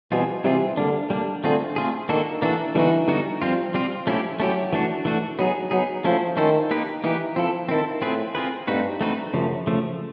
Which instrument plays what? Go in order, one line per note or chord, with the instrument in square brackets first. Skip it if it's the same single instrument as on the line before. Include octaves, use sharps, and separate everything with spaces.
[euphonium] B2 [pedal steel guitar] E3 G3 C4 F4 G#4
[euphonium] C3 [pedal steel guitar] E3 G3 C4 F4 G#4
[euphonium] D3 [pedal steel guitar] G3 A#3 D4
[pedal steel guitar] G3 A#3 D4
[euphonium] D3 [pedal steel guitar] A3 C4 F4 G#4
[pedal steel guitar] A3 C4 F4 G#4
[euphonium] D#3 [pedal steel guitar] A#3 D4 F#4 A4
[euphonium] E3 [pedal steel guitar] A#3 D4 F#4 A4
[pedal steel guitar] D3 G3 B3 D#4 F#4 [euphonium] E3
[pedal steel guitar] D3 G3 B3 D#4 F#4
[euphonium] F3 [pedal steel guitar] G3 C4 F4
[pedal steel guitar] G3 C4 F4
[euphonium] F3 [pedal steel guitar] A3 C#4 E4 G4
[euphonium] F#3 [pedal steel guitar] A3 C#4 E4 G4
[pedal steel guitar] E3 A3 D4 F#4
E3 A3 D4 F#4
[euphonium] F#3 [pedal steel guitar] B3 D#4 G#4
[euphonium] F#3 [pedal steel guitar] B3 D#4 G#4
[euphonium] F3 [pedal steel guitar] A3 C#4 E4 A4 C5
[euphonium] D#3 [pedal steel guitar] A3 C#4 E4 A4 C5
[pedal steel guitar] A#3 D#4 G4 B4
[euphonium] E3 [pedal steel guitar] A#3 D#4 G4 B4
[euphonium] F3 [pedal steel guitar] C4 E4 A4
[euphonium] D#3 [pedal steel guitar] C4 E4 A4
[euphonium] A2 [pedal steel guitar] C4 F4 G#4 B4
[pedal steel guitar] C4 F4 G#4 B4
[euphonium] G2 [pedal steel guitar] A3 C4 D#4 F#4 B4
[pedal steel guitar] A3 C4 D#4 F#4 B4
[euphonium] F#2 [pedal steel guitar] C#3 F3 A3
[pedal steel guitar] C#3 F3 A3